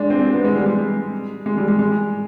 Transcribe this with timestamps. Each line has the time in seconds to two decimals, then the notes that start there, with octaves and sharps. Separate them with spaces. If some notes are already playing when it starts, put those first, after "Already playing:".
Already playing: G#3 D4
0.10 C4
0.21 C4
0.33 B3
0.45 G#3
0.56 G3
0.66 G#3
1.46 G#3
1.57 G3
1.68 G#3
1.79 G#3